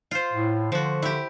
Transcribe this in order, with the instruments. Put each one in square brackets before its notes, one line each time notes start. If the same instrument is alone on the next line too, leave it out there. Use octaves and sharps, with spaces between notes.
[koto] F4 C5
[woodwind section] A2
[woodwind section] D3 [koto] F3 F#4
[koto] E4 G4